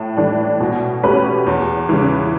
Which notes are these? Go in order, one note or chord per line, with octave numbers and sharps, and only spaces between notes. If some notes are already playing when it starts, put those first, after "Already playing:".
Already playing: A2
E3 A3 D4
B2
A3 C#4 G4 B4
E2
C#3 E3